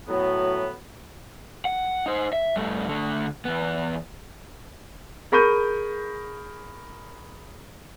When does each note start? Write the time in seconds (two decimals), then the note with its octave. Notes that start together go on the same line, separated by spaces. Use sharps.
0.08 A2 F#3 B3
1.65 F#5
2.06 D#4 C5
2.33 E5
2.56 G2 A3
2.89 D3 A3
3.45 E2 B3
5.32 G#4 A#4 B5 C#6 G6 D#7